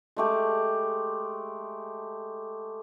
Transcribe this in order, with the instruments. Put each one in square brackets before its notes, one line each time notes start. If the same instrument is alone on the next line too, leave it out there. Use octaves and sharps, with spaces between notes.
[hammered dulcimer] G#3 A3 G4